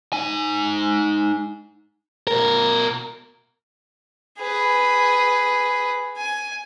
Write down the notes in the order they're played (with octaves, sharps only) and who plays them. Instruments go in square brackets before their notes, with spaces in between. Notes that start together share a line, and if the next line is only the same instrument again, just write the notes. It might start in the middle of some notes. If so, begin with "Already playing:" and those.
[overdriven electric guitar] D#4 G#5
[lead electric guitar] B2 A#4
[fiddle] G#4 B4
G#5